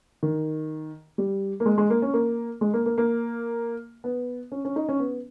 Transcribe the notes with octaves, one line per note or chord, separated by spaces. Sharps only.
D#3
G3
A#3
G#3
G#3
A#3
C#4
A#3
G#3
A#3
A#3
A#3
B3
C#4
C#4
D#4
C#4
B3